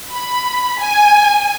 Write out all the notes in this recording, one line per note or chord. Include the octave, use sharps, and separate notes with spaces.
B5
G#5